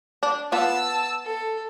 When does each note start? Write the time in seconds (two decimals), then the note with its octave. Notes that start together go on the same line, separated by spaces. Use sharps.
0.23 D4
0.52 B3 F4 A5 E6
1.25 A4